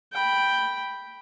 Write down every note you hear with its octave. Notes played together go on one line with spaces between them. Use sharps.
G5 B5